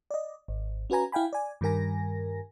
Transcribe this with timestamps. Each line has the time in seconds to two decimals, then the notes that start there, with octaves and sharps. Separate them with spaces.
0.11 D5 D#5
0.48 G#1
0.90 C#4 F#4 B4 G#5 A#5
1.12 E4 F5 G5 G#5 B5
1.33 D5 G#5
1.61 G2 D#3 G3 A#4 G#5 A#6